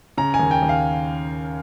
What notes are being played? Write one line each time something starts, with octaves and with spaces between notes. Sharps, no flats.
C#3 A#5
G#5
D#2
G5
D#2
F5